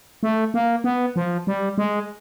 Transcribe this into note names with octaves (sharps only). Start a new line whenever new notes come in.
A3
A#3
B3
F3
G3
G#3